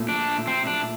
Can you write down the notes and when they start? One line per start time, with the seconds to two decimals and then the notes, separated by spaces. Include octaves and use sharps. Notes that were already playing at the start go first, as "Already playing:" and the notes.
Already playing: A#2 A3
0.09 D4
0.47 C4
0.67 D4